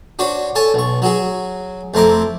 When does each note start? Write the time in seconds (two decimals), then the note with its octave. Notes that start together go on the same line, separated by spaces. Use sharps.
0.19 D4 F#4 C5 C#5
0.55 A4 C#5 G#5 A5
0.74 B1 C#6
1.02 F#3 F#4 G#4
1.94 F2 A3 C4 E4 A#5 D6